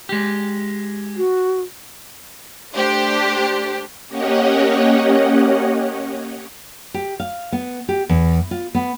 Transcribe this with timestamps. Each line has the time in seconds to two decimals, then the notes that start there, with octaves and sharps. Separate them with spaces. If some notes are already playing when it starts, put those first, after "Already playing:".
0.09 G#3 G4
1.17 F#4
2.75 A3 D4 G4 C5
4.08 A#3 C#4 G4 C#5 D#5 F#5
6.94 G4
7.20 F5
7.52 B3
7.89 G4
8.09 E2
8.51 F4
8.75 B3